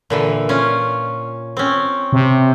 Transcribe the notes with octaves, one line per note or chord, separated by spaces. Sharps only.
A#2 D3 E3
C#4 F4
C4 C#4
C3